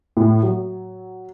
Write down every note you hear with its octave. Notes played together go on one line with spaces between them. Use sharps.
A2
F#3